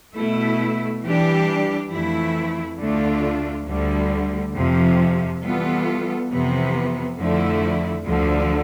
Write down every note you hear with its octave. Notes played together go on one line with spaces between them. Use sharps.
B2 A3 E4
E3 G3 D4 G4
F2 E3 A3 E4
D2 D3 A3 D4 F4
D2 D3 G3
F2 C3 F3
E3 G3 B3 F4 A4
F2 C3 E3 B3
F2 D3 F3 A3 E4
D2 D3 F3